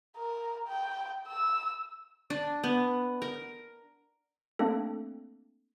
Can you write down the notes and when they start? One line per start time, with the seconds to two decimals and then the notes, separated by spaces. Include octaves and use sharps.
0.17 A#4
0.68 G5
1.27 E6
2.30 D4
2.64 B3
3.22 A#4
4.59 A3 A#3 C4 D4 A4